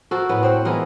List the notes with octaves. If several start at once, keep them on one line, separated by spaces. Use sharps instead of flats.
F#4 A4 A#4 C5
A2 B3
C4 C5 F#5
E3 G#3 B3 A#4